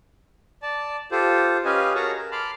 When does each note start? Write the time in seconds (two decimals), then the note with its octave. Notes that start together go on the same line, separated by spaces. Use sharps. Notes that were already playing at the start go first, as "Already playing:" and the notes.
0.62 D5 A5
1.11 F4 G4 A4 C5
1.65 C#4 G4 B4 D#5 F5 G#5
1.95 F#4 G#4 A#4 C#5 A5 A#5
2.16 A#4
2.32 A5 B5 C6 D6 F6